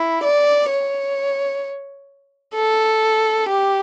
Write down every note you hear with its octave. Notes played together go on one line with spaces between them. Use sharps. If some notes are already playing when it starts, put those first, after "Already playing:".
Already playing: E4
D5
C#5
A4
G4